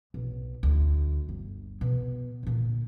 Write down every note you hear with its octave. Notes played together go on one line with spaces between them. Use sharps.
B1
D2
G1
B2
A#2 D3